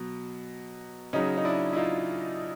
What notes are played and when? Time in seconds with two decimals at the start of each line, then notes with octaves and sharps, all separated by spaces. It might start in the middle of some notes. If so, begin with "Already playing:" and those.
Already playing: B2 F#3
1.13 C#3 F#3 C#4 D#4
1.38 D#4
1.45 D4 E4
1.73 E4
1.77 D#4 F4